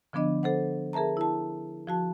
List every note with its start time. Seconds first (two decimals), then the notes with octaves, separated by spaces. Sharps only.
0.13 D3 F3 B3 D4 D#5
0.43 A4 C5 F#5
0.93 G#4 A#4 E5 A5 A#5
1.17 E4 A5
1.87 F3 F#4 A5